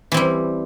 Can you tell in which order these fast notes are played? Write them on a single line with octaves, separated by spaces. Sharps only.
E3 C4 G3